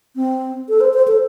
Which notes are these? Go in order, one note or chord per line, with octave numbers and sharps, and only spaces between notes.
C4
A4
C5
C5
A4